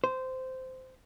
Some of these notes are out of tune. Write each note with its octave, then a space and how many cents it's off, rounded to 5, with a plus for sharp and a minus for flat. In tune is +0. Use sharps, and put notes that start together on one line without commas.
C5 -15